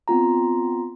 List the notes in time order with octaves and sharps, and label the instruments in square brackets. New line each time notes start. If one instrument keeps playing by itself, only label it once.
[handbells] B3 C4 F4 A#5